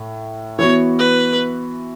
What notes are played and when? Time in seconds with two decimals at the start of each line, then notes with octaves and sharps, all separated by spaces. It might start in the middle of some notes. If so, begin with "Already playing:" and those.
Already playing: A2
0.59 E3 B3 F#4 C#5
0.99 B4